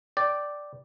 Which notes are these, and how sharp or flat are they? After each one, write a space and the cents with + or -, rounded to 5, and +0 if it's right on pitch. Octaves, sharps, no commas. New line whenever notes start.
D5 +0 G5 -10